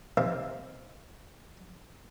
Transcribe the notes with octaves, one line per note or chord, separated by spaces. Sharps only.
C3 D#3 A#3